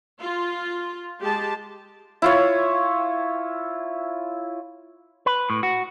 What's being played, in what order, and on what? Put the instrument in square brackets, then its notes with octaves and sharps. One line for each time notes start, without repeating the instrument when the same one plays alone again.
[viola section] F4
G#3 G4 A5
[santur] E4 F4 C#5
[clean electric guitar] B4
A2
F#4